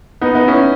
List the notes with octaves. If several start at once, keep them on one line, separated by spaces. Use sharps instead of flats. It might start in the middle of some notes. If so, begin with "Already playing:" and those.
B3 D#4
B3 D#4
C#4 E4